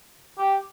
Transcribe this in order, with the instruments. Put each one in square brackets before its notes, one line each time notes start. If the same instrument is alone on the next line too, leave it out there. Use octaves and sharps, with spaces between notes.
[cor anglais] G4